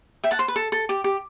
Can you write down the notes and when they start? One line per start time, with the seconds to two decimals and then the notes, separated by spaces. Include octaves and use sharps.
0.24 E5 G5
0.31 F#5 A5
0.39 C5
0.48 B4
0.56 A4
0.72 A4
0.89 G4
1.04 G4